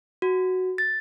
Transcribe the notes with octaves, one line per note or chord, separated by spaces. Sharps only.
F#4
A6